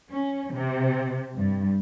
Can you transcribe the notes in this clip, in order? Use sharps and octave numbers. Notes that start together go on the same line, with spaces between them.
C#4
C3
G2